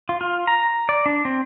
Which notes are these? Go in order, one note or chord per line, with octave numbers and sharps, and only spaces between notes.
F4
F4
A#5
D5
D4
C4